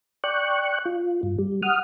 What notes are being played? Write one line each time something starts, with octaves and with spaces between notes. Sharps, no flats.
D5 G5 C#6 F#6
F4
G2
G3
F#5 D#6 F6